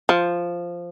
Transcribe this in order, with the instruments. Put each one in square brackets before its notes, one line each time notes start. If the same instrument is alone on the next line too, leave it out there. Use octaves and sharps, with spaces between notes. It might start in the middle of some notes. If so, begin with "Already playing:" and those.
[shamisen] F3